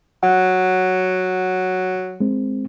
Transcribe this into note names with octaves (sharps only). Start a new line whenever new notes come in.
F#3 F#5
G#3 C4